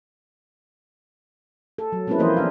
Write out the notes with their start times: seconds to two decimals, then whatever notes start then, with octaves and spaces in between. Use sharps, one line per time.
1.78 A4
1.92 F#3
2.07 G#3 A#3 C4 C#4 E4 B4
2.19 E3 F3 A#3 E4 C5 D#5
2.37 B3 D4 F5